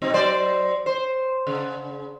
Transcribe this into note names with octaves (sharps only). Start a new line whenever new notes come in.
B2 C4 D#4
F#3 C5 D5
C5
C#3